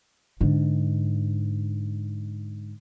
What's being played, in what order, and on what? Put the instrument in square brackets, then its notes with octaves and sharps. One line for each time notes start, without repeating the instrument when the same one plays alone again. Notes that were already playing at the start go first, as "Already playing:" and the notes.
[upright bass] G#2 D3